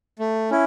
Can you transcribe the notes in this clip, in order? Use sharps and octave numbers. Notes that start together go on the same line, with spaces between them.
A3
C#4 E4